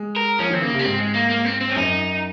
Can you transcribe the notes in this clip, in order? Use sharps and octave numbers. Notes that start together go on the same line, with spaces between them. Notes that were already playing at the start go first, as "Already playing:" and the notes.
Already playing: G#3
A#4
F3 C#4
D#3 C4
C#3 A#3
C3
C#4
G#2 C4
G#3
A#3
A#3
C4
C4
C#4
F#2 D#4